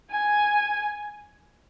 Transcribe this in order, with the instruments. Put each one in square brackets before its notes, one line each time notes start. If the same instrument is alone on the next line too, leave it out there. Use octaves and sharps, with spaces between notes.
[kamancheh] G#5